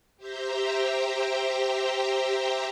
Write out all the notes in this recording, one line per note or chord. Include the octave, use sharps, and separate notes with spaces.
G4 C5 E5 G5 A#5